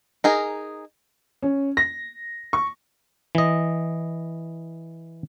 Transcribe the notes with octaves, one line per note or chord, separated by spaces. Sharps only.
D#4 G#4 A#4
C#4
A#6
C#6
E3 D#5